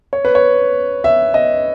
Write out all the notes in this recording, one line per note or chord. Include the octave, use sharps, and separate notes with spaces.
C#5
B4
C#5
E5
D#5